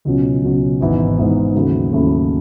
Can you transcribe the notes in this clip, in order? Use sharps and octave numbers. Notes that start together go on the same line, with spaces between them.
C#2 B2 F#3 C#4
C#2 B2 F#3 C#4
G#1 G#2 E3 B3 D#4
G#1 G#2 E3 B3 D#4
D#2 C#3 F#3 A3 E4
D#2 C#3 F#3 A3 E4